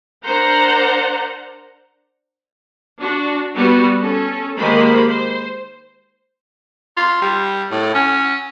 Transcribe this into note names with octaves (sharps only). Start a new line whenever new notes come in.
D4 A#4 C5 F#5 A#5
D4 F#4
G3 B3 F#4
C#4 A4
D#3 G#3 A#3 G4 C5 B5
C5
F4
G3
A2
C#4